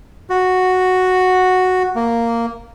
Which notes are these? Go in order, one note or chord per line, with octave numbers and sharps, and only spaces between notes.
F#4
A#3